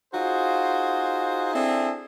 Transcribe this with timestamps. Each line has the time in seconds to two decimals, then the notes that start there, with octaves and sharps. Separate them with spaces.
0.13 D#4 F4 F#4 G#4 C5
1.53 C4 D4 E4 G#4 A4